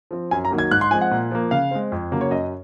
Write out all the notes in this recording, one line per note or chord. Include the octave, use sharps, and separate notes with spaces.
F3 C4
F#2 G#5
A#5
D#3 F#3 A#3
G#6
G#2 F#6
C6
F3 G#3 C4 G#5
F#5
A#2
F3 A#3
C#3 F5
G#3 C4
F2
C#3 F#3 A#3
C#5
F#2 D#5